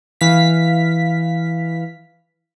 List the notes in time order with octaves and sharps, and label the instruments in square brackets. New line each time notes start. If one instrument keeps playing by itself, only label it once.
[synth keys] E3 F5 B6